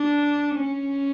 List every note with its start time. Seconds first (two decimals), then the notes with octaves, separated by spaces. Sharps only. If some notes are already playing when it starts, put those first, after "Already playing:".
Already playing: D4
0.55 C#4